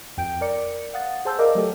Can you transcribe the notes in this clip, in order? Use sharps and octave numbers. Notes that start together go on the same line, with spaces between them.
F2 G5 G6 D7
A#4 D5 C#7
F5 F#5 D#6 A6
G#4 C5 A5 E6 G6
A#4 D5 D#5 F5 D6
F#3 A3 G4 A4